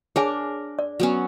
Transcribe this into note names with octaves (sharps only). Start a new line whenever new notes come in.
D4 G#4 A#4 C#5 G#5
D5
F#3 B3 C#4